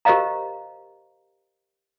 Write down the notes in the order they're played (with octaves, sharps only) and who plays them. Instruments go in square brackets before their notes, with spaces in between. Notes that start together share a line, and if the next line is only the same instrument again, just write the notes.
[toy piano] G4 A#4 C5 D#5 F5 A#5